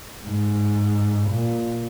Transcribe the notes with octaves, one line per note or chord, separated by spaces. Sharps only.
G#2
A#2